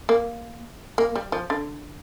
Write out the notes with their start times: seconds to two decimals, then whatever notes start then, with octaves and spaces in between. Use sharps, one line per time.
0.09 A#3
0.98 A#3
1.16 G3
1.32 F3
1.50 D3